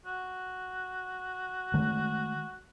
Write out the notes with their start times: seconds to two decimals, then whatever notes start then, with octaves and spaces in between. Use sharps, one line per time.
0.06 F#4
1.74 D#3 G#3 A3